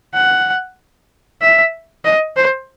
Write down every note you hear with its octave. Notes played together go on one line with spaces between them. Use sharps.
F#5
E5
D#5
C5